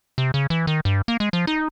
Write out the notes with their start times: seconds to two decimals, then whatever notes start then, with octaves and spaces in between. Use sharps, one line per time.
0.18 C3
0.34 C#3
0.50 E3
0.67 D#3
0.85 G2
1.08 A#3
1.20 G#3
1.33 F3
1.47 D#4